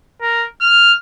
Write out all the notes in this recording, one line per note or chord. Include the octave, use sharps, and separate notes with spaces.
A#4
F6